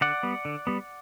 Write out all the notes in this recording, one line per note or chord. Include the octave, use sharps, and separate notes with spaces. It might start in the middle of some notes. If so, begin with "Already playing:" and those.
D3 D5 F#5
G3 B3
D3
G3 B3